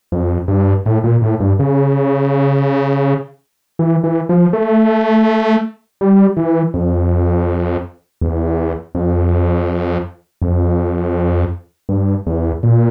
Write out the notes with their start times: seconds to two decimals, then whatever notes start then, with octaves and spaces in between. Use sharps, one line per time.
0.12 F2
0.48 G2
0.86 A2
1.04 A#2
1.22 A2
1.40 G2
1.59 C#3
3.79 E3
4.04 E3
4.29 F3
4.53 A3
6.01 G3
6.37 E3
6.74 F2
8.21 E2
8.95 F2
10.42 F2
11.89 G2
12.27 E2
12.63 A#2